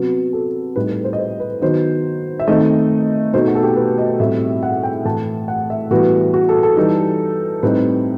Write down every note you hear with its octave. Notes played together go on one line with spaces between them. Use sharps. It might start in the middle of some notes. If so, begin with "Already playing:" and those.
Already playing: C3 F#3 B3
A4
A2 G3 D#4 B4
B4
C5
D#5
C5
B4
D#3 F#3 B3 D#4 C5
E5
D#3 A3 C4 D#4 D#5
B2 A3 D#4 C5
F#4
A4
G4
B4
D#5
A2 G3 C4 E5
F#5
G5
A2 E3 A3 A5
F#5
E5
A2 E3 G3 B3 F#4
F#4
A4
A4
E3 G3 D#4
A2 G3 C4 D#4 B4